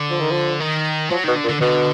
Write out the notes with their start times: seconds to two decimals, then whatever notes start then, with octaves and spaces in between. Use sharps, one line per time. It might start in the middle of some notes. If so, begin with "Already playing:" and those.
Already playing: D3
0.10 F3
0.20 D#3
0.31 F3
0.60 D#3
1.10 F3 F#3
1.24 B2 D#3
1.36 D3
1.44 A#2
1.48 D3
1.60 B2 D3